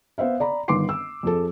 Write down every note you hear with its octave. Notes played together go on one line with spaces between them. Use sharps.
B3 C5 E5 F5
D5 A#5 B5
G1 D#3 B4 C6 D6 C7
E6
F2 G#4 A4